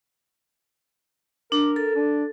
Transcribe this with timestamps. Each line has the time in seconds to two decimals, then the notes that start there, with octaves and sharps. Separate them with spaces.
1.52 D4 A#4
1.76 A4
1.95 D4